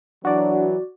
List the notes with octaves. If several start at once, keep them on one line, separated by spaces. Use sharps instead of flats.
E3 F#3 D4 F#4 D5